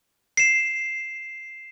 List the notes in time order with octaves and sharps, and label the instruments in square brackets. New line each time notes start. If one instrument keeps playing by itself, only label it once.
[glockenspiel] C7 E7